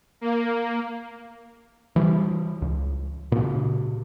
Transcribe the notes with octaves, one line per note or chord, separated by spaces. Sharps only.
A#3
E3 G3
C#2
A#2 C#3